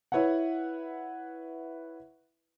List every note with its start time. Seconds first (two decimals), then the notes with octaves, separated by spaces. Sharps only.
0.12 E4 B4 C#5 E5 F#5